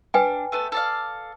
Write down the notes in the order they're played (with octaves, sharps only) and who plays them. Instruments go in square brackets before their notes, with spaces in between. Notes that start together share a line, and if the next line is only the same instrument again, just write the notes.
[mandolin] D4 [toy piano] B4 G5 G#5
[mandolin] A3 B3 A4
A4 D5 F5